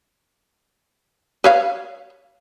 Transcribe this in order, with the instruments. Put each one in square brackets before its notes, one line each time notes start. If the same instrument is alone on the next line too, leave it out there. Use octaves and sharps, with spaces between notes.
[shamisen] B4 C#5 F5